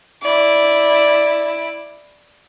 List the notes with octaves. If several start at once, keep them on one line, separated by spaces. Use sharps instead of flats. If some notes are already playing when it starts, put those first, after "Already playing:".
E4 D5